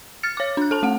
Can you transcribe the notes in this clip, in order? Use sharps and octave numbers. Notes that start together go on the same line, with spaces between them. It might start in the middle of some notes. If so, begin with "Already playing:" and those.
F6 A6 C#7
C#5 D6
D4 F#6
A4 A5
A3 F#5